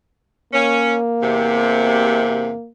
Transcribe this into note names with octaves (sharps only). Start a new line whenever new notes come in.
A#3 C#4
E2 C3